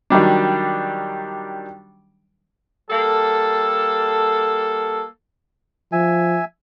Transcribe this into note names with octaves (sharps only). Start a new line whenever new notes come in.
D#3 F#3 G3 D4
G3 A#3 A4
F3 E5 G#5